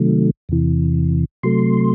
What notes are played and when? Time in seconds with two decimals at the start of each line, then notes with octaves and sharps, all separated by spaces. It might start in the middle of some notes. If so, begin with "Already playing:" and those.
Already playing: C3 D#3 F#3 A3
0.49 E2 C3 E3
1.43 C3 F#3 A3 C6